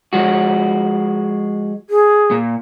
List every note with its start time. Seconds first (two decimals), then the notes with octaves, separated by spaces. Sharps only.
0.13 F3 G#3 F#4
1.90 G#4
2.31 A#2